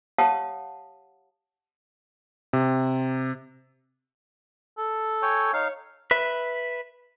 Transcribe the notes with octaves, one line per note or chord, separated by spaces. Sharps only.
G4 C#5 F5 F#5 A5 D#6
C3
A4
C#5 G5 G#5
D#4 C#5 F5
B4 E5